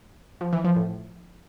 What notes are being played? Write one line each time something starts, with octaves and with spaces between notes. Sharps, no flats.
F3
E3
F3
A2